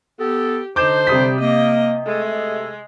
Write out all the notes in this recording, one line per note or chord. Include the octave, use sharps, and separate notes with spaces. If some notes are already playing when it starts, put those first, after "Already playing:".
B3 G4 A4
D3 D4 D#4 C5 D6 G6 E7
C3 G3 D#6 B6
A#3 D#5
G#3 A3 A4